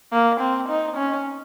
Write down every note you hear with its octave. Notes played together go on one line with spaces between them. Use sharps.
A#3
C4
D#4
C#4